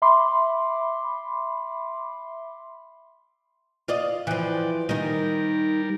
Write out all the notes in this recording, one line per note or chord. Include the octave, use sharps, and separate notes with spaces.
E5 B5 C6 D6
F4 D5 D#5
E3 F3 D5 G5
D#3 G3 D#4 A#4